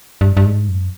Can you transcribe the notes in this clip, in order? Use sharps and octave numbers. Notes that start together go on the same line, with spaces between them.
G2
G2
G#2
F#2